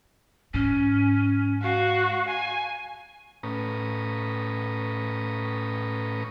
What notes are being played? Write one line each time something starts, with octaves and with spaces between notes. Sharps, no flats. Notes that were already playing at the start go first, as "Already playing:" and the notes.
G#2 C#4
F#4 F5
G#5
A2 C#4 B4 A#5 D#6